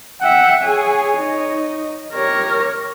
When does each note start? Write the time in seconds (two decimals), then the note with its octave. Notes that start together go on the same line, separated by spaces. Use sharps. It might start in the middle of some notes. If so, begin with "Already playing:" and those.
0.21 E5 F#5 G5
0.63 G#4 C#5 G#5
1.18 D#4
2.13 G4 A#4 C#5